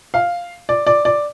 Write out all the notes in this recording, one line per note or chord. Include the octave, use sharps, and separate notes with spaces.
F5
D5
D5
D5